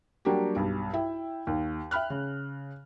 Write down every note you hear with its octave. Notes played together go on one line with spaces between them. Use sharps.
F#3 G3 A#3 D4 F#4 G4
B1 G2
E4 E5 G5
D#2
E5 G5 B5 F6 F#6
C#3